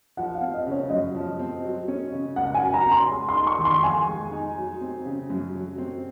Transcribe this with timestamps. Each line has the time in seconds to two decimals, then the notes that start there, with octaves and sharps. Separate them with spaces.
0.17 F3 F#5
0.35 F5
0.41 C4
0.54 D#5
0.66 C#3
0.71 C#5
0.90 F#2 D#5
1.15 F3
1.39 C4
1.64 F#3
1.88 C#4
2.12 C#3
2.36 C#2 F#5
2.54 G#5
2.61 F#3
2.74 A#5
2.86 C#4
2.92 C6
3.11 G#3
3.29 C6
3.34 D#4
3.47 C#6
3.59 D#3
3.65 C6
3.83 F2 G#5
4.07 G#3
4.32 D#4
4.57 F#3
4.81 C4
5.05 C#3
5.30 F#2
5.55 F#3
5.78 C4